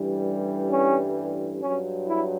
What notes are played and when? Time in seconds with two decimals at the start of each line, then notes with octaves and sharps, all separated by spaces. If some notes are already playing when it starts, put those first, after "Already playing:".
Already playing: A1 G2 E3 G3
0.70 C#4
1.62 G2 F#3 C#4
2.08 E4